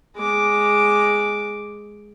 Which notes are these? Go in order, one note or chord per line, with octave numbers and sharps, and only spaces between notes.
G#3 D6